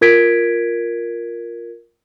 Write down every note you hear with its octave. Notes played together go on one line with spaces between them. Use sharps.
F4 A#4 G#6 B6 D7